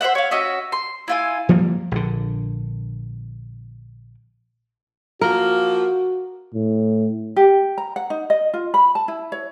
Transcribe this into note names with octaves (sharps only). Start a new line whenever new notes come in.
C5 C#5 E5 F#5
C#5 F5
C#4 F#4 D#5 E5
C6
E4 F4 G#5
F3 G3 A#3
A#1 D3
F3 A#3 F#4 A#4
A2
G4
A#5
F#5
D#4
D#5
F4
B5
A5
E4
C#5